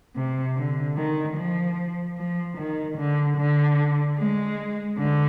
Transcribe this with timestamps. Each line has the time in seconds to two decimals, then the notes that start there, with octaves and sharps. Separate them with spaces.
0.16 C3
0.56 D3
0.97 D#3
1.37 F3
2.17 F3
2.57 D#3
2.97 D3
3.37 D3
4.18 G#3
4.98 D3